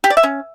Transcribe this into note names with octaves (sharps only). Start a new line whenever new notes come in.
G4
D5
E5
C#4